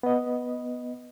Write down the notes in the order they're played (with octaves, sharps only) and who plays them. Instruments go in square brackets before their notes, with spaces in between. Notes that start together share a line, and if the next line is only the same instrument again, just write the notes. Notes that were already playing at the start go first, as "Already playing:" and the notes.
[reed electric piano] B3 D#5